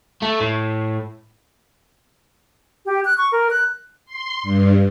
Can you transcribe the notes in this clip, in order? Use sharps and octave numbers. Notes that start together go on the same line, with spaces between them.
A3
A2
G4
F#6
C#6
A#4
F#6
C6
G2